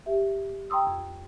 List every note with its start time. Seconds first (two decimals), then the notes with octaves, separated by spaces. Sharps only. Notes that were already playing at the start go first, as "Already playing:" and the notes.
0.06 G4 E5
0.70 G5 A#5 C6 D#6 E6
0.87 F2